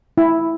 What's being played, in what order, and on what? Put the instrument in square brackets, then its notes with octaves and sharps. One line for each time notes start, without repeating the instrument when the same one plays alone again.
[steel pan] E4